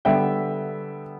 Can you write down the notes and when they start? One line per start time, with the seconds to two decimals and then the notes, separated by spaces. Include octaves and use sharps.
0.05 D3 G3 B3 E5 G5